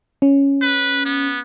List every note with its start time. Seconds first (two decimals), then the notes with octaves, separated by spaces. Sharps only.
0.22 C#4
0.61 B4
1.06 B3